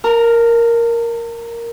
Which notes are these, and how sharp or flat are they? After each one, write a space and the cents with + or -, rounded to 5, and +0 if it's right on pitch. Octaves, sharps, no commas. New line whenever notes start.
A#4 +0 A5 +45